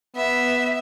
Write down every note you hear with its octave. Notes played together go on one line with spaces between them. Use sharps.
B3 E5